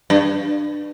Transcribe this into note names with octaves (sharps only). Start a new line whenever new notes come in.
G2